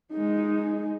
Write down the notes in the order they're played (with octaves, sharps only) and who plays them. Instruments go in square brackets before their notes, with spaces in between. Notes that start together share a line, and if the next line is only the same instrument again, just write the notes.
[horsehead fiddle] G#3 D#4